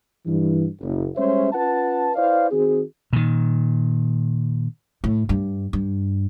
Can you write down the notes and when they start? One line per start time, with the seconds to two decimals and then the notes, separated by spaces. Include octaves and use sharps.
0.26 G2 E3
0.80 F#1
1.16 G3 G#3 C#4 C5 C#5 E5
1.53 C#4 F4 B4 F#5 A5
2.15 E4 B4 C5 D5 D#5 F5
2.51 D#3 C4 F#4 G#4
3.13 A#2 D#3
5.04 A2
5.29 G2
5.73 G2